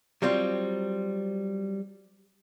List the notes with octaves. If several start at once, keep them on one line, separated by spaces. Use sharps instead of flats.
F#3 G3 C4 F4